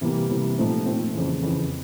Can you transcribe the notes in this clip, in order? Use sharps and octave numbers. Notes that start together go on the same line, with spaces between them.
C3 E3 G3 A#3
C3 E3 G3 A#3
A#2 F3 A3 C4 D#4
A#2 F3 A3 C4 D#4
F2 C#3 E3
F2 C#3 E3